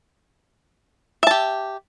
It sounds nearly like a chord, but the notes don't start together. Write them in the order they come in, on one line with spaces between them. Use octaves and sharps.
E5 A5 G4